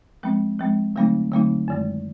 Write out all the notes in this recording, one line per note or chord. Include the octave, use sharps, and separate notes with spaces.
F3 G#3 C4
F3 G#3 C4
D3 F#3 A3 C4 D#4
D3 F#3 A3 C4 D#4
F#2 D#3 G#3